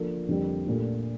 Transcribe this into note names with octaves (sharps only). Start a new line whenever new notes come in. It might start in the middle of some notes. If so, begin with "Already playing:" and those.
Already playing: F3 A#3 D4 A4
F2 D3 G3 A#3
A#2 A3 D4 G4